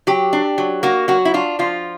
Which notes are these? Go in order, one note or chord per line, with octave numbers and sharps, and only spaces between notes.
F#3 G4
D4
F#3
A#3 F#4
F#3 F#4
E4
D4 F4
F3 F4